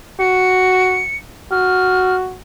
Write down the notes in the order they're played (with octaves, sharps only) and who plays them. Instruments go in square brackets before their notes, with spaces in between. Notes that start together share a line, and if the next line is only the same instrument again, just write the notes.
[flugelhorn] F#4 [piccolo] C#7
[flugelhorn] F#4 [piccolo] F6